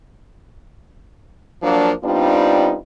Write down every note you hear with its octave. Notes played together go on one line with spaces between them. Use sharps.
F3 F#3 A#3 D4
G3 B3 C4 D4 D#4 F4